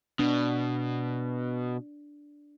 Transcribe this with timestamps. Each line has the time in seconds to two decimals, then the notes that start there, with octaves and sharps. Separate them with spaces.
0.19 B2 D4